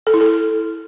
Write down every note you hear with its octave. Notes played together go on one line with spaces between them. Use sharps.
A4
E4
A4